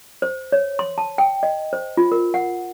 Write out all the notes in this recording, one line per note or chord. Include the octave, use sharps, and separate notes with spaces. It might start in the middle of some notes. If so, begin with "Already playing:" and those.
C5
C#5
C6
A5
G5
D#5
C5
F4
A#4
F#5